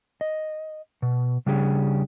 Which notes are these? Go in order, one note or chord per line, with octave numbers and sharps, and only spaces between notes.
D#5
B2
C#3 G3 D4 G4 G#4